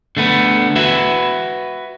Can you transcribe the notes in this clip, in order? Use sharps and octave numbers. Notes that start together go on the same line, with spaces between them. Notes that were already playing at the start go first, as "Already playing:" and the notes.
D3 A3 B3
F#4 B4 E5